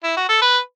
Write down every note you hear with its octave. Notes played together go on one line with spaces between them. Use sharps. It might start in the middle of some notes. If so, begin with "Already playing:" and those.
E4
F#4
A4
B4